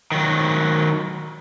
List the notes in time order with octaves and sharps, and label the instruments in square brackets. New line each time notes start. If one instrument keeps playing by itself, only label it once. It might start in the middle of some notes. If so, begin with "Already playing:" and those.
[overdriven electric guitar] D#3 F#3